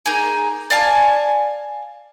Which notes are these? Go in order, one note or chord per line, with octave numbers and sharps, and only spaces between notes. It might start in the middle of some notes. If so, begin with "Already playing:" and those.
A#3 D#4 G#4
D5 F5 G#5 A5